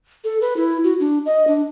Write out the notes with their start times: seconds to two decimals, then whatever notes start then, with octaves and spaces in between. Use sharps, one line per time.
0.24 A4
0.41 B4
0.57 E4
0.84 F#4
1.00 D4
1.26 D#5
1.47 D4